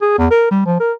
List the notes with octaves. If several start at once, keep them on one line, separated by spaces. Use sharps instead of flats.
G#4
E2
A#4
G3
F3
A#4